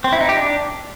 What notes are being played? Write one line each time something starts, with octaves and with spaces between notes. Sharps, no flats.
C4
E4
D#4
G4
D4